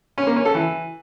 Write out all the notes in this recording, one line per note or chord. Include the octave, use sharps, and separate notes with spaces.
C#4
A#3
C#4
A4
E3